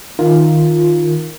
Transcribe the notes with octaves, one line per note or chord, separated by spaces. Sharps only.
D#3 F4 A#4